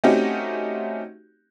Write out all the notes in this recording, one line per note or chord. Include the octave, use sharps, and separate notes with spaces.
A3 C4 C#4 D#4 F#4 G4